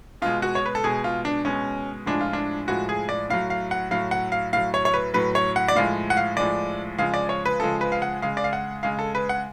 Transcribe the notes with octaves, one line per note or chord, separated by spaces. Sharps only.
B2 G#3 F4
F#4
C#5
B4
A4
B2 G#3 G#4
F4
D4
B2 G#3 C#4
A2 F3 G#3 D4
F4
D4
A2 F3 G#3 F#4
G#4
D5
A2 F#3 F5
F5
F#5
A2 F#3 F5
F#5
F5
A2 F#3 F5
C#5
C#5
B4
A2 F#3 B4
C#5
F#5
D5
A2 F3 G#3 F5
F#5
F5
A2 F3 G#3 D5
C#3 F3 G#3 F5
D5
C#5
B4
C#3 F3 G#3 A4
B4
F5
F#5
C#3 G#3 F5
D5
F5
F#5
C#3 G#3 F5
A4
B4
F#5